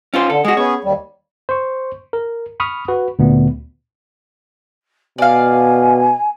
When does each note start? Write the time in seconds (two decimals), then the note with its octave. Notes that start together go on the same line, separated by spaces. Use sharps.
0.14 C#4 F4 C5
0.30 D3 A4
0.45 G#3 F#4 G#4 D#5
0.57 B3 C#4 G#4 C#5
0.84 D#2 G3
1.49 C5 C#6
2.13 A#4
2.60 B5 C#6 D#6 F6
2.88 F#4 B4
3.19 D2 A#2 B3
5.18 B2 D5 F5 G#5